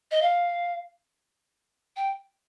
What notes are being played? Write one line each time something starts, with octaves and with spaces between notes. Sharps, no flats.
D#5
F5
G5